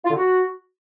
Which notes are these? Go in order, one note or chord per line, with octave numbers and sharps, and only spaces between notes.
F4
D3
F#4